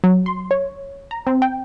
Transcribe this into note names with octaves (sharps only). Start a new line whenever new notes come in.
F#3
C6
C#5
A#5
C4
G5